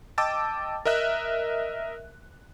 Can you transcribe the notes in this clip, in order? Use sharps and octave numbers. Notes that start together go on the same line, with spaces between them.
D#5 G5 A5 D6 E6 A6
A#4 D#5 E5 F#6